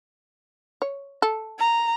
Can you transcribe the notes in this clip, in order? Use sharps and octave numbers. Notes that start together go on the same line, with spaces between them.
C#5
A4
A#5